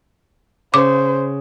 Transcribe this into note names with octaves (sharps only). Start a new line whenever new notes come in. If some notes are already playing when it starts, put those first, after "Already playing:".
C#3 C5 D6